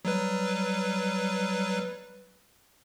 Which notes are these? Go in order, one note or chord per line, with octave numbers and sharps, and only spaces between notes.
F#3 G3 B4